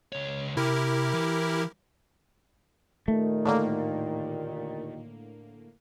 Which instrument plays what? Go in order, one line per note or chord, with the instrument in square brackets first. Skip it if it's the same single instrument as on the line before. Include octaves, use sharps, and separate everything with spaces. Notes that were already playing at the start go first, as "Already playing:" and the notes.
[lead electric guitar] C#2 C#5
[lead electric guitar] C3 [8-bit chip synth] E4 G4 A#4
[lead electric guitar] E3
[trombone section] D#2 A#2 D#3 [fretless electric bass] A3
[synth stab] A2 D3 A#3